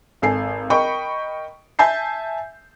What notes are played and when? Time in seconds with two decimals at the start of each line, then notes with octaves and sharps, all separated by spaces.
0.22 G#1 A4 G#5 C7
0.70 A#4 D#5 G5 B5 C#6
1.79 E5 G#5 A5 G6 C7